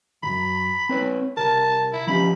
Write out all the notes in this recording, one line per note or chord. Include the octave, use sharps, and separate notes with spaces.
C#2 F#2 B5
C4 B4 C#5
C2 A#4 A5
E4
F3 C#4 G4 B5